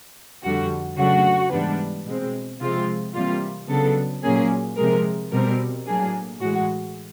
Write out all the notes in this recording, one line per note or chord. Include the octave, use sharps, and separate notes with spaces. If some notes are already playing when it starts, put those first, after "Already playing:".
F2 D3 G3 F#4
C#3 F#3 A3 D4 F#4
G#2 E3 G3 B3 D4
B2 G#3 C4
C3 F3 G#3 C4 F4
C3 E3 G3 A#3 F4
C#3 F#3 B3 D4 A4
A#2 F#3 A#3 C#4 G#4
C3 F3 G#3 A#4
B2 G3 C4 A#4
A2 F#3 A#3 D4 G#4
A2 E3 G#3 F#4